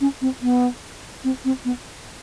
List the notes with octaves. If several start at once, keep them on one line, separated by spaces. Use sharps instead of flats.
C#4
C4
B3
C4
C4
B3